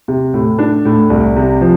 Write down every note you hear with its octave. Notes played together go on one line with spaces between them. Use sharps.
C3
A2
D4
A2
C2
C3
F3